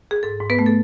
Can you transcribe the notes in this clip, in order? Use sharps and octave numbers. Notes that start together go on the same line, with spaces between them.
G#4
G#2 A4
G#2
B3 B4
A3
A4